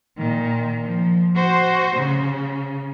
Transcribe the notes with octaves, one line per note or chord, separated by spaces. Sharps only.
A#2 D#3
F3
F#4 C5
C#3